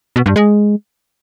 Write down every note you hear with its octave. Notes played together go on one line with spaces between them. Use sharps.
B2
G2
G#3